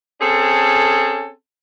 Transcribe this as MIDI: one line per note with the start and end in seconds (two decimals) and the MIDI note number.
0.22 1.30 60
0.22 1.30 61
0.22 1.30 68
0.22 1.30 69